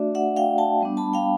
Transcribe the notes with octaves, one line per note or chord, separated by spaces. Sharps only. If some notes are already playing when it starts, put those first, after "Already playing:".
Already playing: A3 D4 F#4 D5 E5
E5 F#5
F5 G5
G5 A5
G3 B3 D4
A5 B5
F5 G5